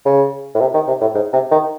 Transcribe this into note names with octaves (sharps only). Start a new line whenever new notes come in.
C#3
A2
C3
D#3
C3
A2
G#2
C3
D#3